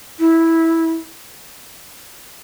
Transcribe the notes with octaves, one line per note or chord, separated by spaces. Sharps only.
E4